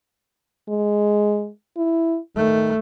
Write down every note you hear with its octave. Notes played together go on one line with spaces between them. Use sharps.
G#3
E4
D#3 A3